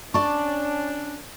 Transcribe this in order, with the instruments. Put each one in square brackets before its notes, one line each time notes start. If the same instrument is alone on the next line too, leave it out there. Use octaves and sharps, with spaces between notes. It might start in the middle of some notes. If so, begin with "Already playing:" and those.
[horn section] C#4 D4 [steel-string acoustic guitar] D5 A5 [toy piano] C#6